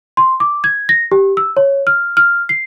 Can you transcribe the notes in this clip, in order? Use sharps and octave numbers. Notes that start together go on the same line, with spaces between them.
C6
D6
G#6
A#6
G4
E6
C#5
F6
F6
C7